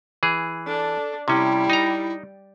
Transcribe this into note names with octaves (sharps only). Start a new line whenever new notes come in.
E3 G#4
D4 A4
C3 G3 C#4 E4
D#4 A#5